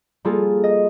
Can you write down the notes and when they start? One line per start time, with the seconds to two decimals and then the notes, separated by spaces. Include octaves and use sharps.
0.25 G3 A#3 F4 G#4 A4
0.64 D#5